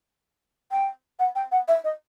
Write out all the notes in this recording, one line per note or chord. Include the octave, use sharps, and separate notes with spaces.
G5
F#5
G5
F#5
E5
D#5